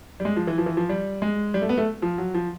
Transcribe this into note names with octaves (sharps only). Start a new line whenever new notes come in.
G3
G#3
F3
E3
F3
E3
F3
G3
G#3
G3
A3
B3
A3
F3
F#3
F3